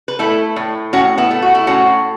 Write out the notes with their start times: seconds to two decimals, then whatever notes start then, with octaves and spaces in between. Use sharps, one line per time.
0.08 B4
0.19 A3 E4 A4
0.56 A2
0.93 A2 C#4 F#4
1.18 B3 E4
1.31 A3
1.42 F#4
1.55 E4
1.67 A2 C#4 F#4